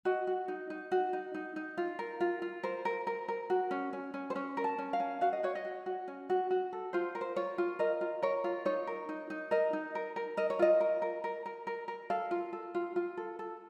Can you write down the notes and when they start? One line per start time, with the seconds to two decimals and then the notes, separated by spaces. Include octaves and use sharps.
0.05 F#4 D#5
0.27 F#4
0.48 D#4
0.70 D#4
0.92 F#4
1.13 D#4
1.34 D#4
1.56 D#4
1.77 F4
1.99 A#4
2.20 F4
2.42 F4
2.63 A#4 C5
2.85 A#4
3.07 A#4
3.28 A#4
3.50 F#4
3.71 C#4
3.93 C#4
4.14 C#4
4.30 C5
4.35 C#4 C#5
4.57 A#4
4.64 A5
4.78 C#4
4.93 F5
5.00 C#4
5.21 F#4 F5
5.33 D#5
5.43 F#4 C#5
5.55 D#5
5.65 F#4
5.86 F#4
6.08 C#4
6.30 F#4
6.51 F#4
6.73 A4
6.93 F4 C5
7.15 A#4
7.21 C5
7.36 F4 C#5
7.58 F4
7.79 A#4 D#5
8.01 F4
8.23 A#4 C#5
8.44 F4
8.65 D#4 C#5
8.87 A#4
9.09 D#4
9.30 D#4
9.51 A#4 D#5
9.73 D#4
9.95 A#4
10.16 A#4
10.37 A#4 D#5
10.50 C#5
10.59 F4 D#5
10.80 A#4
11.02 A#4
11.24 A#4
11.46 A#4
11.67 A#4
11.88 A#4
12.10 A4 F5
12.31 F4
12.53 A4
12.75 F4
12.96 F4
13.17 A4
13.39 A4